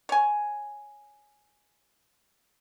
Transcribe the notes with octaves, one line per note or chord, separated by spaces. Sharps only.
C#5 G#5